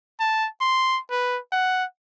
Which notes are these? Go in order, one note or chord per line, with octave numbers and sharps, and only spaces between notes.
A5
C6
B4
F#5